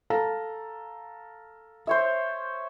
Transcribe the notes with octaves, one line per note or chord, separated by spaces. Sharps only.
A4 F5 A#5
C5 C#5 E5